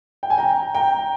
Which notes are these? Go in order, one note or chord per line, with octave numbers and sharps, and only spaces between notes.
G5
G#5
G5 A#5
G5 A#5